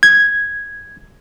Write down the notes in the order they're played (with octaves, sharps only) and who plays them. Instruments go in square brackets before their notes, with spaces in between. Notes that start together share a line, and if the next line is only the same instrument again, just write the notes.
[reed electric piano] G#6